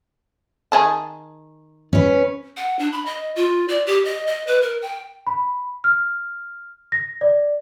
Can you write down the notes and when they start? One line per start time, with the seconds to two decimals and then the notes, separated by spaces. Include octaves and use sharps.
0.72 D#3 G#4 A5
1.93 C#4 B4
2.57 F#5
2.79 D4
2.92 B5
3.06 D#5
3.36 F4
3.68 D5
3.87 G4
4.05 D#5
4.27 D#5
4.47 B4
4.62 A#4
4.82 G5
5.27 B5
5.84 F6
6.92 A#6
7.21 D5